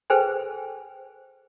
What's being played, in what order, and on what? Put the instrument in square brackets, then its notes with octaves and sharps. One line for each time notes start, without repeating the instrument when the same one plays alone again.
[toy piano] G#4 A4 B4 C5 G5 G#5